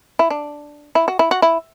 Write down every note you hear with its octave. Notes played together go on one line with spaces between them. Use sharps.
E4
D4
E4
F#4
E4
F#4
E4